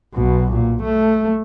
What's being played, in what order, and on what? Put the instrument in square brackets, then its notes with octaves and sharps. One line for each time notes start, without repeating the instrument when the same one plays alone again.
[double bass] B1 B2
A#2
A3